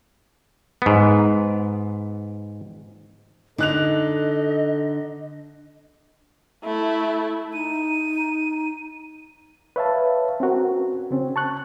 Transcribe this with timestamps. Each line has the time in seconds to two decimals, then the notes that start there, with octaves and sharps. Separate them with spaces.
0.82 G#2 B3
3.58 D3 D#4 A4 D#5 F#6 F7
6.64 A3 E4
7.53 D#4 D#7
9.76 B4 C#5 E5 F5 A5
10.40 C4 C#4 F#4 A#4
11.11 C#3 C4 C#4
11.36 A5 C#6 F#6